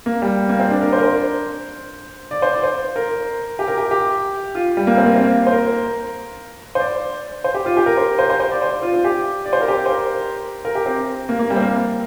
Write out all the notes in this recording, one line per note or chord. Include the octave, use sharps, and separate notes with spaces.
A#3
G3
A#3
C4
D4
A#4
C5
A#4
C5
D5
C5
D5
C5
A#4
G4
A#4
G4
G4
F4
G3
A#3
C4
A#3
C4
A#3
C5
A#4
C5
D5
C5
G4
F4
G4
A#4
C5
C5
C5
C5
D5
C5
F4
F4
G4
D5
C5
A#4
G4
C5
A#4
A#4
G4
C4
A#3
A#3
G3
C4
A#3